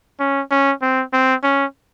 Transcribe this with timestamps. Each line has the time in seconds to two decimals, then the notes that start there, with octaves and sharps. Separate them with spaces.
0.20 C#4
0.51 C#4
0.82 C4
1.13 C4
1.43 C#4